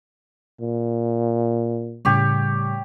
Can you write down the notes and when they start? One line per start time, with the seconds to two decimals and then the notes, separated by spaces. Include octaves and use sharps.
0.61 A#2
2.05 A2 C#3 G3 G4 C#5